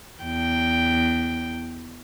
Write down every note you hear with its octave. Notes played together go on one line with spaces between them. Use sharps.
E2 G5